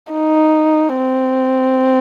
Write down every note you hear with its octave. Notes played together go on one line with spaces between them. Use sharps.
D#4
C4